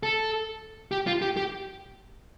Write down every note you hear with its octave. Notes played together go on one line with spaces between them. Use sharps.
A4
G4
F4
G4
G4